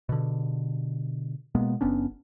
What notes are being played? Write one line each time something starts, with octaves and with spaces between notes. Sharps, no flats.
B2 D3
B2 G#3 A#3 B3
F#1 B3 C#4 D4